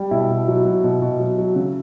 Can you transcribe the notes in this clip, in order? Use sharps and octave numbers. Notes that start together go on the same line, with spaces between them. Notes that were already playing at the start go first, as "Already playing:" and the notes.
Already playing: G3
B2 E4
B2
F#3
F#3
B2
B2
F#3
F#3
C#3